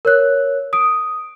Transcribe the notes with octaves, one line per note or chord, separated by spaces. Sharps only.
A#4 C#5 F#6
D#6 D7